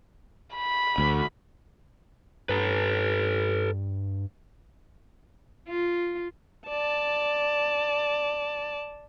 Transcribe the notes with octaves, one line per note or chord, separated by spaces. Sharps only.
B5
D2
G2 A4 B4
F4
D5 A5